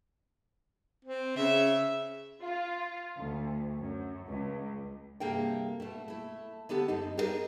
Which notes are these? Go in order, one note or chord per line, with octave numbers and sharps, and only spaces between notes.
C4
C#3 E5
F4
D2
F#2
C#2
G2 C3 A#3 G#4 A4 G5
B2 A3
A3 E4
D3 B3 G4 A4 A5
F#2 C4 D#4
G4 G#4 A#4 C5 D#5